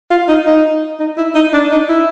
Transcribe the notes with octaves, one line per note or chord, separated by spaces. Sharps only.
F4
D#4
D#4
D#4
E4
D#4
D4
D#4
E4